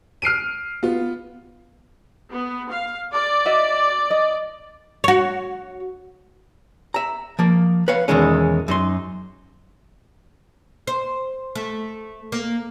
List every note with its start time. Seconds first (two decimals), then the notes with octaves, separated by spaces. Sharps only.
0.22 F6 C7 D7 D#7
0.83 B3 F4
2.32 B3
2.69 F5
3.12 D5
3.45 F#4 D#5 E5
4.11 D#5
5.04 F#4 C#5
6.94 E5 A#5
7.39 F3 A#3
7.88 B4 C#5 F5 F#5
8.08 E2 B2 D#3 G#3 C#4
8.68 F#2 D#4 C6
10.87 C5
11.55 A3
12.32 A#3